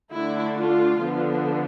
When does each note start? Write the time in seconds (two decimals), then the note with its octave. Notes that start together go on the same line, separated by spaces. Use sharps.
0.11 D3 A3 D4 E4
0.56 F4
1.00 D3 F3 B3 D4